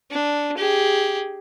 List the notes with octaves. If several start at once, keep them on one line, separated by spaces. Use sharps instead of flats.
D4
G4 G#4